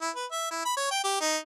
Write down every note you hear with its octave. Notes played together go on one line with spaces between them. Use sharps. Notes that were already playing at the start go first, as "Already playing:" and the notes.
E4
B4
E5
E4
B5
C#5
G5
G4
D#4